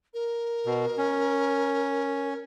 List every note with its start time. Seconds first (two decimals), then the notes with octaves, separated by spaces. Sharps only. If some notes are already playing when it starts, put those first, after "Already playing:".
0.14 A#4
0.66 B2
0.98 C#4